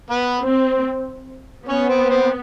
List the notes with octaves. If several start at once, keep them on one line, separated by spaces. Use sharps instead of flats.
B3 B4
C4
B3 C#4 C#5
C4 C5
C4 C5